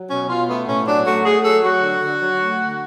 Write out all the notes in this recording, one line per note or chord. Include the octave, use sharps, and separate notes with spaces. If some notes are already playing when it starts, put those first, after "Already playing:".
Already playing: F#3
B2 C#4
B2 F4
A3 B3
A2 C#4
F#3 D4
A3 F#4
A3 G#4
F#3 A4
F#3 F#4
D3
D3
F#3
A3
D3